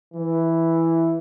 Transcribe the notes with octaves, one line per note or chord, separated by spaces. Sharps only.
E3